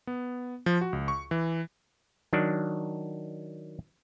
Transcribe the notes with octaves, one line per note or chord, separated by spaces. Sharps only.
B3
F3
F#4
C#2
C#6
E3
D#3 F#3 D4